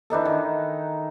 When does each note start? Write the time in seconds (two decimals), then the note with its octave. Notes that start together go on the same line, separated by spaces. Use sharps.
0.10 E3 D4 D#4 A4
0.25 D#3